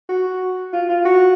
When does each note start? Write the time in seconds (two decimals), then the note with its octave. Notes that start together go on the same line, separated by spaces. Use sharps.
0.09 F#4
0.73 F4
0.89 F4
1.05 F#4